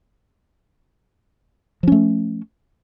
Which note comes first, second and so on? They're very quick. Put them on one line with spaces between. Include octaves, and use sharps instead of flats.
F3 C#4 A3